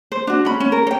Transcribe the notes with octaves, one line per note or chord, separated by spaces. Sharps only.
C5
D4 F#4
C#4 B5
C#4
A#4
C#5 G5